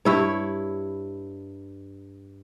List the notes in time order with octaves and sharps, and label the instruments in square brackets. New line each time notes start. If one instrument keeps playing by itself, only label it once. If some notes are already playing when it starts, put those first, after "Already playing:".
[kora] G2 E4 C#5